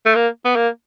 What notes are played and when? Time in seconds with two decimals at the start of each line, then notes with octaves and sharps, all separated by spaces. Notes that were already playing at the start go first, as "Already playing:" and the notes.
0.06 A3
0.15 A#3
0.45 B3
0.56 A#3